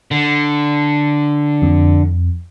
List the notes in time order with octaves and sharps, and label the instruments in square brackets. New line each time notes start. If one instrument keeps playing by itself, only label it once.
[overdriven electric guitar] D3
[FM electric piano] F2